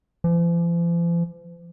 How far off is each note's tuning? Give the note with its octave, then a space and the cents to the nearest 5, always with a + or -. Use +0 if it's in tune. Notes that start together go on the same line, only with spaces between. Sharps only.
F3 -45